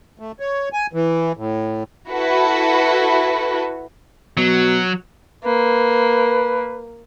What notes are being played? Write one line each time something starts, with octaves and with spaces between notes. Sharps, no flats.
A3
C#5
G#5
E3
A2
E4 F#4 A4 B4
B2 F#3
A#3 B4